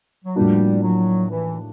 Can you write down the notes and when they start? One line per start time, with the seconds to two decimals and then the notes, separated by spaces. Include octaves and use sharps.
0.25 F#3
0.35 A2 F3 G3 A#3 D4 F#4
0.82 F#3
1.28 E3